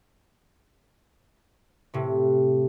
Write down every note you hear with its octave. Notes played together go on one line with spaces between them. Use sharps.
A2 C3